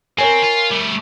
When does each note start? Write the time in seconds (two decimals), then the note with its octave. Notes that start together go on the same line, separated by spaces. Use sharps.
0.18 C4 A#4 C#5 G#5
0.42 F4
0.71 G3 A3